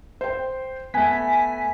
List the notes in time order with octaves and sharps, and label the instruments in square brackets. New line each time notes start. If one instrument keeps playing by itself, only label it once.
[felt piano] C5 G5
[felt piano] A3 B3 [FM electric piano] G#5 B6